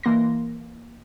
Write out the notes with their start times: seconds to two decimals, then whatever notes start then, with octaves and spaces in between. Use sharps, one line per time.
0.03 E3 A#3 C6 A#6